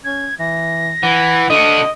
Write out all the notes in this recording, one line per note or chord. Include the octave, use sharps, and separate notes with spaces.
C#4 G#6
E3 A#6
E3 F#5
D3 F#4 D#5 D#7